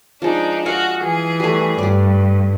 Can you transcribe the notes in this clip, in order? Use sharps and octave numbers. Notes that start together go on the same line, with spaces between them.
F3 G#3 D4 D#4
F#4 D#5 F5 G#5
E3 G#4
G3 A3
G2 G3 D5